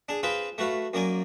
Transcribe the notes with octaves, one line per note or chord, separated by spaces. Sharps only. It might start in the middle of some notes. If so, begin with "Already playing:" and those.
D4 G#4
C4 F4 G#4 B4 C5
A3 F#4 B4 F5
F#2 A#3 D5 G#5